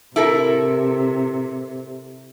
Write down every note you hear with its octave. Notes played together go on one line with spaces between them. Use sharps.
C3 E4 A4 A#4